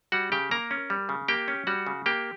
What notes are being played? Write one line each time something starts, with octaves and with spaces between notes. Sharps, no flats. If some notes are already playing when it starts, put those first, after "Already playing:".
G3 F#4 F#5
C#3 G4 G5
A#3 A#4 A#5
C#4
G3
C#3
A#3 G4 G5
C#4
G3 F#4 F#5
C#3
A#3 G4 G5